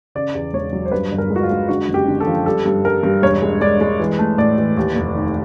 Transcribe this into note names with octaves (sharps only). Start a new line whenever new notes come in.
C#3 D5
E2
E1 C#5
F#3
C5
G2 B4
G1
A#4
G#3
F#4
F4
G#3
D3 F#4
F#1
G4
D3
A4
F3
G3 A4
G2
G3 A#4
G2
E1 C#5
G#3
G#3 D5
G#3
E3
A3
A2 D5
E3
D#2
F1
D#3